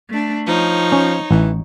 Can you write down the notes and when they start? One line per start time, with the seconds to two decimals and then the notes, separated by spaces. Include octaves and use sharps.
0.11 A3 D4
0.48 F3 D#4 C#5
0.92 C#4
1.31 A1 E3